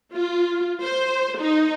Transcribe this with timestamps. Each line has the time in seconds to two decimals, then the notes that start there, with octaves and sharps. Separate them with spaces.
0.15 F4
0.84 C5
1.40 D#4